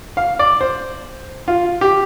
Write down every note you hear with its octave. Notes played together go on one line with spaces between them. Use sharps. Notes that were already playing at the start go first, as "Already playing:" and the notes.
F5
D5
C5
F4
G4